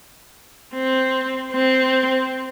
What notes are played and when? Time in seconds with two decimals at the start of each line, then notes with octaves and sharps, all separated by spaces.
0.73 C4
1.52 C4